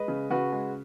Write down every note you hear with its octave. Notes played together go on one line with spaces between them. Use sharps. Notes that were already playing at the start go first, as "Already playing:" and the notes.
Already playing: G#3 B4 D#5
C#3
C#3 F#4 B4
G#3